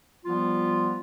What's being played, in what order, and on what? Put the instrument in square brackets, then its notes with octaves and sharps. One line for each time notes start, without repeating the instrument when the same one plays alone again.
[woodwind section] F3 G3 B3 F4